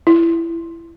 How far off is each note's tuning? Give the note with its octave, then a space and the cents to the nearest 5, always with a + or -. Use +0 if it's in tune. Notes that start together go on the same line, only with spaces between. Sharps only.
E4 +20